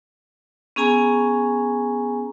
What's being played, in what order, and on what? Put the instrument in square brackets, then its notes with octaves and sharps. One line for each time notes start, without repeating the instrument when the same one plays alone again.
[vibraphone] B3 C#4 G#4 G#5 A#5